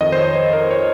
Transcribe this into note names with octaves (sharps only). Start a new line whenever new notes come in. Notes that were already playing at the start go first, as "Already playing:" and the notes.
F2 D#3 D#5
C5
C#5
C5
A#4
C#5